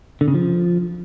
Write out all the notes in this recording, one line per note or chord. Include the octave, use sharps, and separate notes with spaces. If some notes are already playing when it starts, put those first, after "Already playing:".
D3
C#3
F3